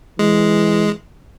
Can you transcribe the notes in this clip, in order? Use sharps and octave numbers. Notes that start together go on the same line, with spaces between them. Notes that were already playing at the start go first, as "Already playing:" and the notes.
E3 G#3